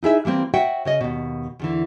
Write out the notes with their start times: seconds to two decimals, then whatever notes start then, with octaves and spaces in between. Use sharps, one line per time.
0.03 D#4 E4 G#4 E5
0.25 E3 G3 A#3 C4
0.54 F#4 C#5 E5 F#5 G5
0.85 C#3 C#5 D#5
1.01 D#2 B2
1.59 E2 D3 E3